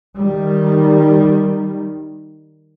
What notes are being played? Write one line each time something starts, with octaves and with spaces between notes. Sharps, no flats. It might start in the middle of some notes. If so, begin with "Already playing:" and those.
D#3 G3